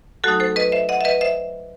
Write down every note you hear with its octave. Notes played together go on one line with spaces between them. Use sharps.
F#3 A3 D#4 F#4 A4
A4 C5
B4 D#5
C5 E5
D#5 F#5
E5
B4 D#5
C5 E5